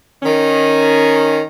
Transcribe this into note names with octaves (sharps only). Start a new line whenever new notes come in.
D#3 C#4